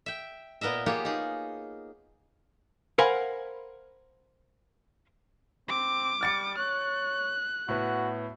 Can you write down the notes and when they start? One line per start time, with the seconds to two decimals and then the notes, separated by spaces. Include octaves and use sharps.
0.06 E5 G5
0.61 A#2 B3 A#4 D#5 E5
0.86 A#3 B3 F4 G4 G#4 C#5
1.05 D#4 G#4
2.98 A#4 C5 F5 F#5 G#5 B5
5.69 C4 D6
6.21 G3 F6 A6 C#7
6.57 C#5 F#6
7.68 A2 B3 F#4 B5